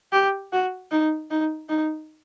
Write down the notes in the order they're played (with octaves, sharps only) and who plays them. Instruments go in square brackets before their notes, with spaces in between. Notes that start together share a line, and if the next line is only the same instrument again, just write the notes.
[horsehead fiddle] G4
F#4
D#4
D#4
D#4